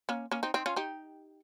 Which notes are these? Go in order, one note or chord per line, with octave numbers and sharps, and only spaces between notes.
A#3 C#4
A#3 C#4
C4 D#4
C4 D#4
C#4 F4
D#4 G4